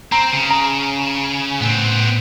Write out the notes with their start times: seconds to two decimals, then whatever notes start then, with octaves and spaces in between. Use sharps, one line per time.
0.12 C4 A#5
0.33 C#3
0.50 A#5
1.61 A2 B3 C4